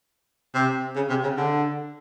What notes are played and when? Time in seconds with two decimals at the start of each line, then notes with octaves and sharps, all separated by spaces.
0.54 C3
0.95 C#3
1.09 C3
1.23 C#3
1.37 D3